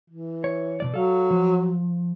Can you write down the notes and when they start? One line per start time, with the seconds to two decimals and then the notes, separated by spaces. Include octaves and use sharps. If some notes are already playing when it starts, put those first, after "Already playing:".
0.10 E3
0.44 C#5
0.80 B2 F3 D5
0.94 F#3 A4 F5
1.31 F3